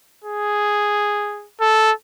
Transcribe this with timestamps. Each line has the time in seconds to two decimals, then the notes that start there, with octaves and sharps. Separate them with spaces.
0.24 G#4
1.61 A4